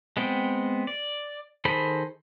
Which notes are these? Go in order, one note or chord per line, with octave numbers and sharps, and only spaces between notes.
G#3 B3 C4 G5
D5
D#3 G#4 A4 C5 B5